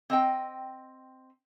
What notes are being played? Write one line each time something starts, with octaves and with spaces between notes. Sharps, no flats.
C4 D#5 G5